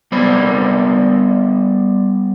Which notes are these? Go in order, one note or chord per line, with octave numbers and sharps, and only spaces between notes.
G3 B3 C5 D5 B5